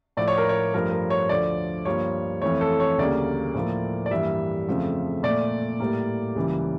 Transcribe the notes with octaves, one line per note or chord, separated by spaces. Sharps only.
A2 F3 A3 D5
C#5
A#4
C#5
G2 F3 A3 A#4
A#4
C#5
D2 D3 F3 A3 D5
G2 F3 A#3 C#5
F2 E3 A3 C#5
A4
C#5
D2 C#3 G3 A#3 D5
A2 F3 A#3
D5
G2 E3 G3 A#3 E5
F2 C#3 F3 A3
A#2 A3 D5
A2 G3 A#3
C#2 C#3 E3 G3 A#3